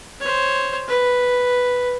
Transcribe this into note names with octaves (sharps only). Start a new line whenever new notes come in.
C5 C#5
B4